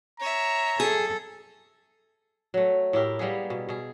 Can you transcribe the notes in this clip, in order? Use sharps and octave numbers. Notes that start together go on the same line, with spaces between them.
C#5 E5 A#5
G#4 A4
F#3 A3
A2 E4 G4 A#4
G3 A#3 B3 G#4
B2
B2 G#4